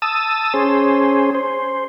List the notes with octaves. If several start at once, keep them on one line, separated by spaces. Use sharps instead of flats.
A5 D#6 E6
C#4 G#4 C5
C5